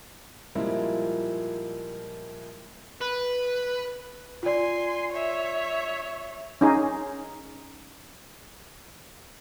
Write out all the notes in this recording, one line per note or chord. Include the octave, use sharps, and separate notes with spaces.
A#2 F3 G3 G#3 A#3 E4
B4
F4 D5 G#5 C6
C#5 E5
C#4 D#4 G#4